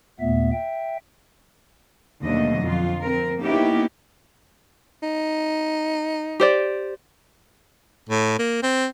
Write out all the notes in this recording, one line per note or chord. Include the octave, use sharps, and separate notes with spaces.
D#2 A#2 A3 B3 E5
E5 G5
D#2 B2 D3 F#3 A3 D#5
F2 F4
C4 A#4
A#3 B3 C#4 D#4 E4 G4
D#4
G4 C5 D5
A2
A#3
C4